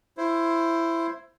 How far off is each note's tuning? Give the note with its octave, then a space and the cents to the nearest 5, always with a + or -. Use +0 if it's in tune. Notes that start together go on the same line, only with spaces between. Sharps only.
E4 +15 C5 +5